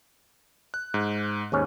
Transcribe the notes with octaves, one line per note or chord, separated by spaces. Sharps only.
F#6
G#2
D#2 G#2 C#4